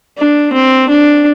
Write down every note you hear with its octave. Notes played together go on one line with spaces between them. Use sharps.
D4
C4
D4